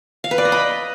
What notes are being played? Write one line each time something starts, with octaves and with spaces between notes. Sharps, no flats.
F5
B4
D5
D#5
B5